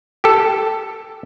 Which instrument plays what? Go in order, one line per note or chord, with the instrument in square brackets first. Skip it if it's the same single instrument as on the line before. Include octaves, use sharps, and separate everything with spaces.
[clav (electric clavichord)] G4 A4